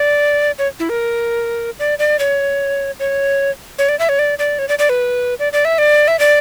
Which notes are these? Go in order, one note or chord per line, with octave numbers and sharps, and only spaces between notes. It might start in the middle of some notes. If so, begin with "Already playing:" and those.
Already playing: D5
C#5
E4
A#4
D5
D5
C#5
C#5
C#5
D5
E5
C#5
D5
D5
C#5
D5
D5
B4
D5
D5
E5
D5
E5
D5